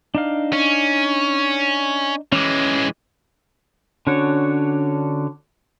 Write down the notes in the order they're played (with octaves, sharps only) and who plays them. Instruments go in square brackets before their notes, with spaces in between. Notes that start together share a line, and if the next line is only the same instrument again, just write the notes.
[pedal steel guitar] D4 D#4 F5
[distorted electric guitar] C#4
[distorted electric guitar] E3 G#3 [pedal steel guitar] C#4 D6
[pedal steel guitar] D3 C#4 D4 F#4 C#5